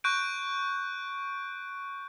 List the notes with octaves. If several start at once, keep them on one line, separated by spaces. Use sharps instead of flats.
C#6 F#6 G6 D7